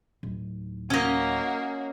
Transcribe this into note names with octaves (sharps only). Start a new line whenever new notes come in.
D1 D#4
A#3 C#4 F#4 D#5